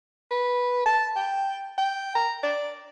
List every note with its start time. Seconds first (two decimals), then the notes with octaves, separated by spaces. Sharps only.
0.31 B4
0.86 A5
1.16 G5
1.78 G5
2.15 A#5
2.43 D5